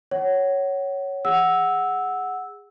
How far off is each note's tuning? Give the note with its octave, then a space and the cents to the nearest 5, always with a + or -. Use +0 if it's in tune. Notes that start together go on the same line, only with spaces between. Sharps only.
C#5 +0 F#5 +25
G#4 -20 F#5 +0 E6 -10